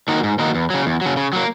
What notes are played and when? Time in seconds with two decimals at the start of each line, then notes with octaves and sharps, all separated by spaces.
0.08 D#3 A#3 D#4 F#4
0.23 G#2
0.39 D#3 A#3 D#4 F#4
0.55 E2
0.70 C#3 F#3
0.86 E2
1.01 C#3 F#3
1.17 C#3
1.33 F#3 A#3